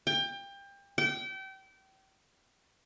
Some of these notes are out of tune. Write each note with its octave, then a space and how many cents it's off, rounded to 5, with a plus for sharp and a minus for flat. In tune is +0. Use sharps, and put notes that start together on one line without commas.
G5 +25
G5 -30